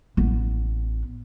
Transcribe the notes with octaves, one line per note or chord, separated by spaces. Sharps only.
A1 B3